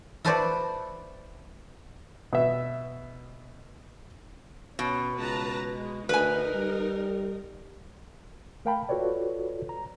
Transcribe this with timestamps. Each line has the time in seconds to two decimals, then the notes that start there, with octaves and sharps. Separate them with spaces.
0.25 E4 F#4 A4 B4 C5 D5
2.33 B2 E5
4.79 B2 C#4
5.18 C#2 B4 A5 A#5
5.73 G#3
6.09 D2 D#4 A#4 B4 G#5
6.55 G3
8.65 A3 A#4 F5 G5 A5 B5
8.89 F4 F#4 A4 B4 C#5 D5
9.69 A#5